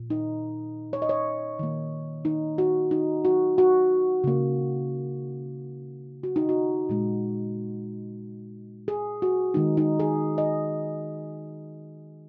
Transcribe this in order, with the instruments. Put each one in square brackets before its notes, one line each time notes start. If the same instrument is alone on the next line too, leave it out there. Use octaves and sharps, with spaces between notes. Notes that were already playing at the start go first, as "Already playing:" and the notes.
Already playing: [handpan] A#2
D#4
C#5
D#5
C#5
D#3 A#3
D#4
F#4
D#4
F#4
F#4
C#3 A#3
F#4
D#4
F#4
A#2 G#3
G#4
F#4
D#3 G#3 D#4
D#4
G#4
D#5